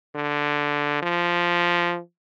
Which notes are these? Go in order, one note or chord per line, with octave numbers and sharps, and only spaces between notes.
D3
F3